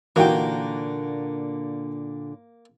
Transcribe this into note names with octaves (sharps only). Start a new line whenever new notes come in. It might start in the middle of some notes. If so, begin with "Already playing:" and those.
A#2 D3 E3 A#3 D#4 F#4 G4 G5